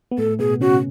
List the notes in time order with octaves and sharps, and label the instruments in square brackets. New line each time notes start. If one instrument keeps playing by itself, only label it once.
[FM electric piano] B3
[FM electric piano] A2 A3 [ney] A4
[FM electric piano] B2 B3 [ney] G#4
[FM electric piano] C#3 C#4 [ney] F#4